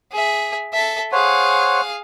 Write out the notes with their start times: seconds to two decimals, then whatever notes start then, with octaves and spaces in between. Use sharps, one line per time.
0.12 G#4 E5
0.73 A4 E5
1.12 G#4 C5 C#5 F5 F#5